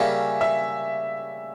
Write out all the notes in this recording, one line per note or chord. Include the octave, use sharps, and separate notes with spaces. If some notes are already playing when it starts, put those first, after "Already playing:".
Already playing: C#3 G3 A#3 C#4 E5
E5